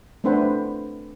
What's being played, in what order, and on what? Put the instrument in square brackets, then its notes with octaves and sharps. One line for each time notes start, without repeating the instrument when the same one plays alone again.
[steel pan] A3 C4 D4 B4 C5 F#5